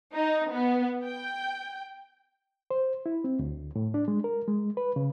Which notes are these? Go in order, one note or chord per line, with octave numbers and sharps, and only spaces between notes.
D#4
B3
G5
C5
E4
C4
D2
A2
D4
G#3
A#4
G#3
B4
C#3